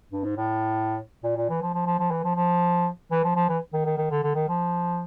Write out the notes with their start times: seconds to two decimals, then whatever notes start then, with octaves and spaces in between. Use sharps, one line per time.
0.12 G2
0.24 G#2
0.37 A2
1.24 A#2
1.37 A#2
1.49 E3
1.62 F3
1.74 F3
1.86 F3
1.99 F3
2.11 E3
2.24 F3
2.36 F3
3.12 E3
3.24 F3
3.36 F3
3.49 E3
3.73 D#3
3.85 D#3
3.98 D#3
4.11 D3
4.23 D3
4.35 D#3
4.49 F3